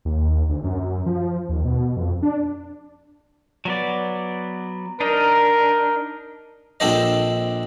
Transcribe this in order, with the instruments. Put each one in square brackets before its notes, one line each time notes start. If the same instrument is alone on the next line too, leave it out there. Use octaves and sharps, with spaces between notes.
[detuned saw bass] D#2
D2
F#2
F3
D#2
B2
F2
D4
[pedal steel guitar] F#3 B3 D5
[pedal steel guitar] D4 D#4 [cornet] A#4
[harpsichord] A#1 C4 D4 A4 C5 D#5